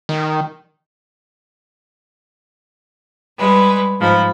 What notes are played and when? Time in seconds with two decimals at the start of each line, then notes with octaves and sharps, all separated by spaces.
0.09 D#3
3.37 G3 G#3 B4
3.99 G#2 F3 B5